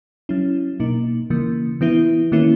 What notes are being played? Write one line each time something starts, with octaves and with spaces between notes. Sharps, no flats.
F#3 C#4 E4
B2 A#3 D#4
C#3 E3 A#3
E3 B3 E4
D#3 A#3 C#4 E4